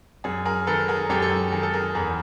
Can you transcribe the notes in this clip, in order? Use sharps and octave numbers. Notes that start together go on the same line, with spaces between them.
F#2 G#4
G#4 A#4
D#3 A4 B4
G#4 A#4
A#4
F#2 G4 A4
A4
G#4
D#3 G#4
A4
G#4 A#4
E2 G#4 A#4